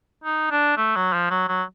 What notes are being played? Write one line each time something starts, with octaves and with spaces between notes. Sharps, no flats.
D#4
D4
A3
F#3
F3
F#3
F#3